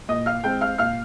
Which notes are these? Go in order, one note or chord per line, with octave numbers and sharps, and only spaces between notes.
A#2 D#5 D#6
F5 F6
G#3 C4 G5 G6
F5 F6
A#2 F5 F6